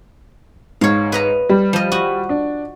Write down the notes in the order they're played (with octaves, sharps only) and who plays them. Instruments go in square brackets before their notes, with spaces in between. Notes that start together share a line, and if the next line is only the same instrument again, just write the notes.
[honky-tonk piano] G#2 [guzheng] C#5 F5
[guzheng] B4 D#5 A#5
[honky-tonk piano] G3
[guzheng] F3 D#5
F#4 D#5
[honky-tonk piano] D4